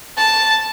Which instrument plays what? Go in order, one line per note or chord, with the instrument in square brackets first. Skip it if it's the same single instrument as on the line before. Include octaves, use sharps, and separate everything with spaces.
[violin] A5